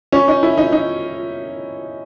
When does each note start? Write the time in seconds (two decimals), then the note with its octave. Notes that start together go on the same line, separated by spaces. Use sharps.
0.12 C#4
0.28 D#4
0.43 E4
0.57 D#4
0.72 D#4